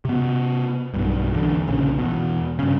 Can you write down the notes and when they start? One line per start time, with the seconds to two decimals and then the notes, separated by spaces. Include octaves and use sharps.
0.05 C3 B3
0.94 B1 G2
1.34 E2 D3
1.68 A#1 C#3
1.98 E2 B2
2.59 G2 C#3